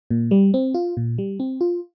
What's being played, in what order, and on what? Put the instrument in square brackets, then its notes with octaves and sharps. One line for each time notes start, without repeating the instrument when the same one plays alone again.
[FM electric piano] A#2
G3
C4
F4
A#2
G3
C4
F4